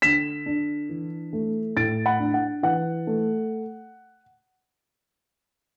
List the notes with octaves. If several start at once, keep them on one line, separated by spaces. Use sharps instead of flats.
D3 B6 E7
D4
E3
A3
A2 A6 D7
F#5 B5
D4
F#5
E3 F#5
A3